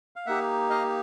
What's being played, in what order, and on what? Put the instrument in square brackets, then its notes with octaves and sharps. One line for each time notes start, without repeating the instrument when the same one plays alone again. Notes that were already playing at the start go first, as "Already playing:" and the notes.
[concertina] F5
A#3 D#4 G4 E5 F#5
D#5 F5